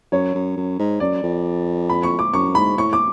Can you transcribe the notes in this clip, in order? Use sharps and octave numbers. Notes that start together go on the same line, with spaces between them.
F#2 C#5
F#2
F#2
G#2
F#2 D5
F2
B5
C#6
D6
F#2 C#6
G#2 B5
A2 C#6
D6